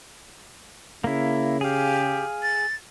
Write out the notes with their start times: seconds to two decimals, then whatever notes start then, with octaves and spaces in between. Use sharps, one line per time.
1.04 C#3 A#3 E4
1.61 G4 G#4 F5
2.43 A6